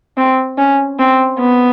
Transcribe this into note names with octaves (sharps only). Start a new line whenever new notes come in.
C4
C#4
C4
B3